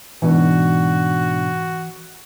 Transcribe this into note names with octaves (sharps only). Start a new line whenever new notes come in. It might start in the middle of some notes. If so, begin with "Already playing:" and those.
G#2 B2 E3 D4 F#4